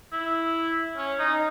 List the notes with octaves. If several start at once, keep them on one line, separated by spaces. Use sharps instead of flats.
E4
C#4
D#4